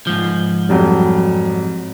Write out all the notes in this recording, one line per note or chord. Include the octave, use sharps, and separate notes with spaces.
G#2 F3
F2 F#3 G3